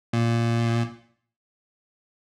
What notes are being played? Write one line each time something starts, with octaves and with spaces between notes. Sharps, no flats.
A#2